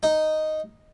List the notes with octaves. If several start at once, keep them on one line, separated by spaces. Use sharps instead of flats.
D#4